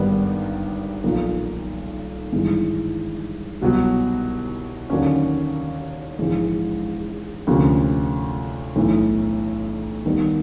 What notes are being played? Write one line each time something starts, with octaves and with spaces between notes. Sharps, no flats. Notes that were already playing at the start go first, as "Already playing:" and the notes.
Already playing: G#1 G2 D#3 G3 B3
B1 A#2 F3 A#3
G#1 G2 E3 G#3
C2 B2 F#3
D#2 D3 F#3 A#3 C#4
A#1 G#2 E3 G#3
D2 C3 F3 A#3 C#4
B1 A2 E3
D#2 D#3 G3 B3 D#4